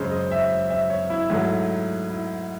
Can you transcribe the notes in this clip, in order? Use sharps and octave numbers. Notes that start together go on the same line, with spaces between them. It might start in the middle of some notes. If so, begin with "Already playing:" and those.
Already playing: F#2 C#3 G#3 C5 C#5
D#5
E5
E5
C#5
E4
G#2 F#3 A3
E4